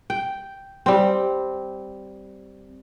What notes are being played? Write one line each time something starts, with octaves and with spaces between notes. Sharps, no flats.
G5
G3 C4